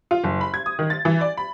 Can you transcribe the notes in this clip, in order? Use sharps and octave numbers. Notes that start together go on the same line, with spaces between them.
F4
F#1
B5
G#6
D#6
D#3
A6
E3
D5
B5